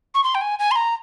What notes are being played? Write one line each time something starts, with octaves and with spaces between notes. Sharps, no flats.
C#6
C6
G5
G#5
G#5
C6
A#5